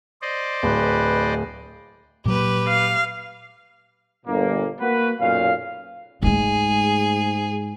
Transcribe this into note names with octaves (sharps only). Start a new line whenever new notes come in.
C5 D5 D#5
D1 B4
A#2 F#3 A#3 G4 B4
F5
G1 A#2 A#3
A#3 F#4 B4
B1 F#2 A#2 C#4 F5
G#2 G#3 A3 G#4